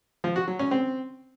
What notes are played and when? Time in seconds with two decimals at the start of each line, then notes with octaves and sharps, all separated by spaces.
0.24 F3
0.36 F#4
0.48 F#3
0.59 C#4
0.71 C4